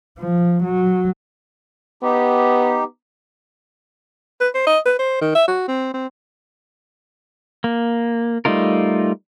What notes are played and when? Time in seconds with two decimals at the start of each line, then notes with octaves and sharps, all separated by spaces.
0.18 F3
0.64 F#3
2.03 B3 D#4 G4
4.40 B4
4.54 C5
4.67 D#5
4.85 B4
4.99 C5
5.21 D#3
5.35 E5
5.48 F#4
5.68 C4
5.94 C4
7.64 A#3
8.45 G3 A3 D#4 F4 A#4